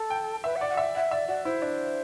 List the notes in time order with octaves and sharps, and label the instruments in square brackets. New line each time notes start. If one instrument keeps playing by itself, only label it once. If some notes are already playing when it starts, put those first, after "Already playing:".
Already playing: [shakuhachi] A4
[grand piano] G5
[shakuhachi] B4 [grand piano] E5
[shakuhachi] F#5
[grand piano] D5
[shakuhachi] F#5
[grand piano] E5
[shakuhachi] E5 [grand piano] F#5
[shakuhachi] D5 [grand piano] E5
[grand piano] F#4 [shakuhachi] D5
[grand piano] E4 [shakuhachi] C5
[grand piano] D4